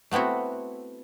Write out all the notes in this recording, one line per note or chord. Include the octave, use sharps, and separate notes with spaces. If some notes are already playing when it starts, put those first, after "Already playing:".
A3 B3 C4 E4 F#4